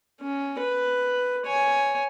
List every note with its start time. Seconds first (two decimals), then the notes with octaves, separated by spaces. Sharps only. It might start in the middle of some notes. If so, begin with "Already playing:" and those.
0.21 C#4
0.59 B4
1.46 C#5 G#5